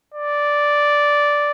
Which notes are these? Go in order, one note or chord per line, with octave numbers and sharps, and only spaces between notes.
D5